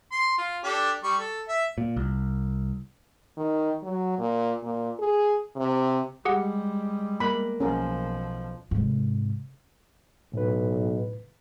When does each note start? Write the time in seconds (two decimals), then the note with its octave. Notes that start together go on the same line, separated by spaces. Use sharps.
0.12 C6
0.38 F4
0.64 D4 G4 A4
1.04 G3 C#6
1.18 A4
1.48 E5
1.78 A#2
1.97 C2
3.37 D#3
3.83 F#3
4.19 A#2
4.63 A#2
4.99 G#4
5.56 C3
6.25 G3 G#3 G4 G#4 F#5
7.20 A#3 B5
7.60 B1 F3 C#4 A#4
8.71 G#2 C3
10.34 B1 A2 B4